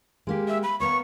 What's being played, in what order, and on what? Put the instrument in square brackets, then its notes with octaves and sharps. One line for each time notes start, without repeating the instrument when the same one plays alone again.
[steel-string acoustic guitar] G#3 A#3 G4
[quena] E5
B5
[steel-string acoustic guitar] A#3 B3 C#5 [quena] C#6